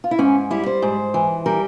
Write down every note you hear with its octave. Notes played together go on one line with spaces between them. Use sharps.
F4
E4
G#2 C#4
G3 E4
C5
G#2
E3
G3 A#4